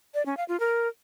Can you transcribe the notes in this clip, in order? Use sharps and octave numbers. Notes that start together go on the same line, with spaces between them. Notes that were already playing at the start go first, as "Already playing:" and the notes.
D5
C#4
F5
F4
A#4